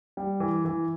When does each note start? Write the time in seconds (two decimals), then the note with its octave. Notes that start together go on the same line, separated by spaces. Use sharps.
0.17 G3
0.40 E3
0.65 E3